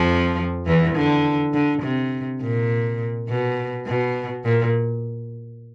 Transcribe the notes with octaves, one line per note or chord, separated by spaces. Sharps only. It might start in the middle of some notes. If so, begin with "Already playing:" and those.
Already playing: F2 F3
E2 E3
D3
D3
C3
A#2
B2
B2
A#2